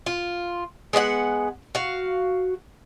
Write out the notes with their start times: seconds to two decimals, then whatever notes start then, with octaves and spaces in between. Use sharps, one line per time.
0.06 F4
0.93 G#3 B3 D5 F#5
1.75 F#4 F5